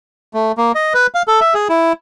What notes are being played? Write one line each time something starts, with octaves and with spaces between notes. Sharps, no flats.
A3
A#3
D#5
B4
F5
A4
E5
G#4
E4